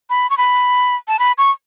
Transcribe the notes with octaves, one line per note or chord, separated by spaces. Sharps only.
B5
C#6
B5
A5
B5
C#6